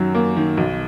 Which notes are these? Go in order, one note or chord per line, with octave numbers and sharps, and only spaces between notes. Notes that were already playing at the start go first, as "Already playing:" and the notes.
Already playing: F#2 D#3 F#3
A#3
D#3
B1